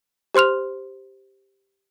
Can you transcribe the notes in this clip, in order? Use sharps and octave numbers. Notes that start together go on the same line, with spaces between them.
G4 C5 C6 F6 F7